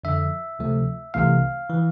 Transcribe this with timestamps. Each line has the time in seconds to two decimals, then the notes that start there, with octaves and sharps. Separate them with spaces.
0.04 F2 D3 F3 E5
0.59 D2 C3 F3 A3
1.14 C2 C3 E3 A3 F5
1.69 E3